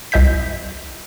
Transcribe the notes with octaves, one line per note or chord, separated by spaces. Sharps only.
C2 D#5 E5 G6 B6